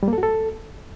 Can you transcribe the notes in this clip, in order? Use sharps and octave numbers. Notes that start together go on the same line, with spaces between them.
G3
A#3
A4
F#4
A4